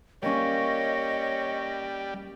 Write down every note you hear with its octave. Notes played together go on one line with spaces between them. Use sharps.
G3 A#3 C#4 C#5 D#5